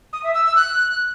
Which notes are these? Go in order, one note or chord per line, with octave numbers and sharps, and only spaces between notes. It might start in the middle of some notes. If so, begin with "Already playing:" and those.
D#6
E5
E6
E6
F#6